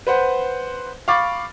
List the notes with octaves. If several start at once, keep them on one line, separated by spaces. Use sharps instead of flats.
B4 C5 F#5
F5 B5 C#6 D6 A6